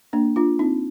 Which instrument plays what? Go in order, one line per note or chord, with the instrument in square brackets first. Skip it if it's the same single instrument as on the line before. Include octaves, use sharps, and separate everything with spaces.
[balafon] A#3 D4
D4 F4
C4 D#4